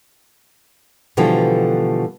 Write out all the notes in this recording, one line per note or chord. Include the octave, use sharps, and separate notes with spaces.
B2 D3 E3 F3 G3 A3